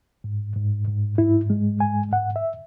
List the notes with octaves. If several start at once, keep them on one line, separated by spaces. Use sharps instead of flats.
G#2
G#2
G#2
G#2 E4
G#3
G#2 G#5
G#2 F#5
E5